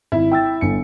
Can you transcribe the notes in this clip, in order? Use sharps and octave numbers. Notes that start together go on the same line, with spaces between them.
G#1 E4
G5 E6 A6
G1 G#5 C#7